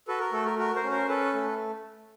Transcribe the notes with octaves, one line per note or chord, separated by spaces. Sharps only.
F#4 A4 B4
A#4
A3 A4
A#4
F#4 A#4
A#4 C5
C#4
A#4 C5
C#4 A4 B4
A3